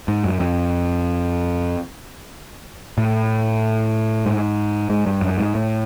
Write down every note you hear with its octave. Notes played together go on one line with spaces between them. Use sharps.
G#2
F#2
F2
A2
G#2
G#2
G2
F#2
G#2
A2